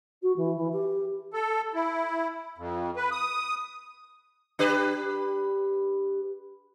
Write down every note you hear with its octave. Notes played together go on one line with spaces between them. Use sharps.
F#4
E3
E3
G4
A4
E4
F2
B4
D#6
D4 G4 B4